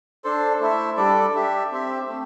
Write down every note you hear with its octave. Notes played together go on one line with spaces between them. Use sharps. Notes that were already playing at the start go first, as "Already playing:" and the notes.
D4 A4 C5
A3 E4 C5 E5
G3 D4 A4 D5
D4 G4 E5
C4 G4 C5 E5
A3 C4